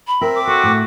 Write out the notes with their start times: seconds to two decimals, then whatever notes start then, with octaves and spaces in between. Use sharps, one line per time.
0.07 B5
0.21 C4 A#4 E5
0.35 D6
0.47 F#4 A4
0.64 A2